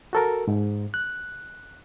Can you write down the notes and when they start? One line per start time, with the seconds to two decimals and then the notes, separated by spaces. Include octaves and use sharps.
0.13 F#4 A4 A#4
0.48 G#2
0.94 F#6